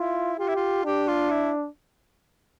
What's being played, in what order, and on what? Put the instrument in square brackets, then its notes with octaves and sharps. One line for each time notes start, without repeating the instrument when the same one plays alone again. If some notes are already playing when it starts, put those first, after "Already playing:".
Already playing: [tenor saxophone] E4 [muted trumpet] F4
[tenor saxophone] F4 [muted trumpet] G4
[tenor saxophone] E4
F4
[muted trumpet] D4 [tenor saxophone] G4
[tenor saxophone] F4
E4